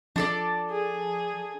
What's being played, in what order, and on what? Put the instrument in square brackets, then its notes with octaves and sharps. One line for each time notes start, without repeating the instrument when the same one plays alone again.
[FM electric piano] F3 [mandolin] D4 A4 D5
[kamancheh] G#4